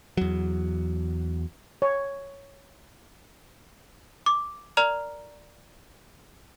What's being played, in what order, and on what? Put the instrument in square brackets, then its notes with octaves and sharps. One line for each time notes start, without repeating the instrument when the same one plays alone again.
[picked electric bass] E2 F#3
[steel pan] C#5
[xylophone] D6
A#4 D5 A#5 F6 F7